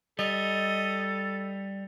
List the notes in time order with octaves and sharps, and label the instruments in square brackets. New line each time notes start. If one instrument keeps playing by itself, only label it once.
[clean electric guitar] G3 [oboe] A4 [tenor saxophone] D#5